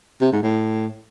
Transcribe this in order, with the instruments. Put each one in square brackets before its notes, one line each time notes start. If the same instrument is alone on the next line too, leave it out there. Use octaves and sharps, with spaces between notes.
[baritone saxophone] C3
G#2
A2